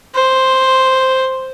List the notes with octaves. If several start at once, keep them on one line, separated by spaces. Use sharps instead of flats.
C5